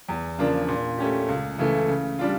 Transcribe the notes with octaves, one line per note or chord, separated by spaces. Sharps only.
E2
C#3 F3 A#3 D4
A#2
A3 C#4 G4
C#2
C#3 E3 A3
C#3
G3 D4 F4